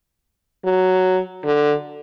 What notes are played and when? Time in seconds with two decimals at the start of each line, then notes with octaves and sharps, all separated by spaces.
0.65 F#3
1.44 D3